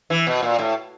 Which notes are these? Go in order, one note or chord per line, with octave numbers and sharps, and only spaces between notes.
E3
B2
A#2
A2